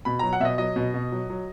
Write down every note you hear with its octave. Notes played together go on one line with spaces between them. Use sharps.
B2 B5
F#3 A#5
F#5
B2 D#5 E5
F#3 D#5
B2
B2
F#3
F#3